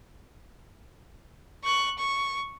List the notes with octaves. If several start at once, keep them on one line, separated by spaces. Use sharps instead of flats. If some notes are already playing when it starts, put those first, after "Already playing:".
C#6 F#6
C#6